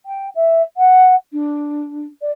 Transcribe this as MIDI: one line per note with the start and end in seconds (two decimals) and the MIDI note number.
0.06 0.28 79
0.35 0.62 76
0.77 1.15 78
1.32 2.07 62
2.21 2.31 74